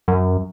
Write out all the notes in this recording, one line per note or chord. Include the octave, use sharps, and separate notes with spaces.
F#2